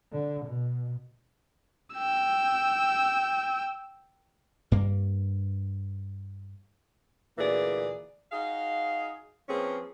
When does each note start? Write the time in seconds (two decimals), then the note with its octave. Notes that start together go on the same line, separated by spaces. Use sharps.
0.12 D3
0.46 B2
1.94 G5 E6
4.72 G2 A#3
7.38 D2 A#2 E3 A#3 G#4 D5
8.32 D#4 F#4 G#4 F5
9.49 F3 A#3 C4 C#4 G#4 B4